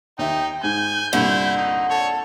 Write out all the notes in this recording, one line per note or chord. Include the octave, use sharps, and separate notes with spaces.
D#2 D#4 E5 G5
G#2 G#5 G6
C2 G2 A#2 D3 E4
D#4
A4 C#5